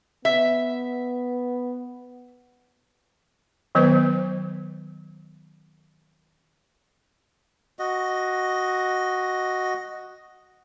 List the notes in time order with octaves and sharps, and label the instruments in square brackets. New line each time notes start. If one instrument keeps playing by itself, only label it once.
[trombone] B3 [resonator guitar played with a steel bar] E5
[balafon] D#3 F#3 B3 B4 C5
[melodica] F#4 D#5